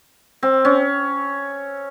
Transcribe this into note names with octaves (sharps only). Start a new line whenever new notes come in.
C4
C#4